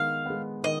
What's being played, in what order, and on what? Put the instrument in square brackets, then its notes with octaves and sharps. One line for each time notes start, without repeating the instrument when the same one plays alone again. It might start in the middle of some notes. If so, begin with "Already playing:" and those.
Already playing: [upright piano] D#3 G#3 B3 [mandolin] F5
[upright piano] G#3 B3
[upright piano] D#3 [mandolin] D#5